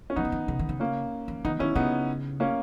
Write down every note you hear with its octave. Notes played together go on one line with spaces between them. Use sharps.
C#4
E3 B3 D#4
C#3
D#3
C#3
D#3
C#3
A#3 C#4
E3
D#3 B3 D#4
D#3 C#4 E4
C#3 B3 D#4
A#3 C#4